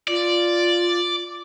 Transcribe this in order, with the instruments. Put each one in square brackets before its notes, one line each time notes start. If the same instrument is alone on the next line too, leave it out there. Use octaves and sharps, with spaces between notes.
[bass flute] F4 [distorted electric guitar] D5